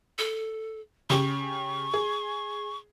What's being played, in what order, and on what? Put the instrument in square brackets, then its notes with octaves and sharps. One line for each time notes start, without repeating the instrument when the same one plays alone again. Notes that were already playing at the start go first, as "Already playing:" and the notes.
[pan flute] A4
[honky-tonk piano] C#3 G4 [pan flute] C#6
[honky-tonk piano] G#4